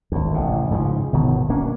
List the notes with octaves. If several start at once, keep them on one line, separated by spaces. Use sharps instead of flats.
G#1 D2
A1 C3
G#2 C#3 E3 F3
G1 B2 D#3
A#3 C#4 D4